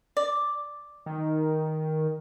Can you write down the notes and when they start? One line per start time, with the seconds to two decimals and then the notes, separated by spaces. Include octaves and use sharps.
0.17 D5
1.06 D#3